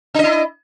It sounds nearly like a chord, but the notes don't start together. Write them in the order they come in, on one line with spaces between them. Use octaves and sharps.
D4 D#5 E4